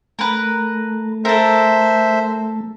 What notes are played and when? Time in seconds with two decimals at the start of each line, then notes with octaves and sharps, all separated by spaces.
0.19 A3 A#4 B4
1.25 A4 A#4 C5 E5